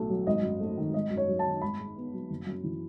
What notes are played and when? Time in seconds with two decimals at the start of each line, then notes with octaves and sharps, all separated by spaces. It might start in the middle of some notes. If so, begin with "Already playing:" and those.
Already playing: B1 A2 A3
0.10 F#3
0.27 G#1 D#5
0.43 F#2
0.60 A3
0.78 D#3
0.94 G#1 D#5
1.10 F#2
1.17 C#5
1.28 F#3
1.39 A5
1.45 D#3
1.62 G#1 B5
1.79 G#2
1.96 B3
2.14 F#3
2.30 F#1
2.47 F#2
2.64 E3